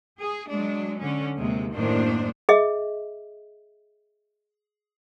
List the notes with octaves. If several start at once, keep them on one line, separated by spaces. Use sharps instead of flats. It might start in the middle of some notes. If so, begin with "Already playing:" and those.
G#4
F#3 G#3 D4
D3 C#4
D#2 C3 G#3
F#2 A2 D#3 A#3 D4 C5
G#4 D#5 E5